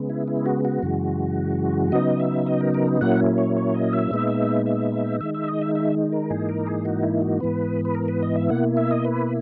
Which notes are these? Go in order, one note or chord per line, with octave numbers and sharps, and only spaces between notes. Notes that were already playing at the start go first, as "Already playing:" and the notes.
Already playing: C#3 G#3 B3
E4
E4
F#4
F#4
F#2 C#3 E3 G#3
C#3 F#3 B3 D#4 D#5
E5
D#5
A#4
A#4
A#2 F#3 A#3 C#4 E4 F#5
C#5
C#5
D#5
E5
A#2 G#3 B3 D#4
E5
D#3 G#3 D#4 E5
E5
D#5
E5
E5
A#4
G#2 E3 A#3 D#4 G#4
A#4
G#4
F#4
E4
F#4
G#2 E3 B3 B4
B4
A#4
B4
D#5
E5
B2 A#3 E4 F#5
E5
D#5
B4